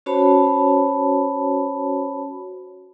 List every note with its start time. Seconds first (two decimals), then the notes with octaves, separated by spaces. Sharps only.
0.06 C#4 F#4 C5 C#5 A5 B5